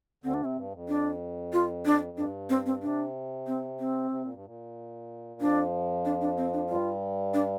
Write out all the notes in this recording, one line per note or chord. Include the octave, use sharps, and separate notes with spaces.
D2 D3 C4
D4
C3 C4
G2
F2
D4
F4
D4
G2 D4
C4
C4
C3 D4
C4
C4
C3
A#2
G2
A#2
F2 F3 D4
D4
D4
C4
D4
G2 G3 F4
D4